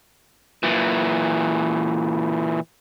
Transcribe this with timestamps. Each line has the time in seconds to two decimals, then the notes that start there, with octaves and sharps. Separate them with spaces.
0.63 A#2 E3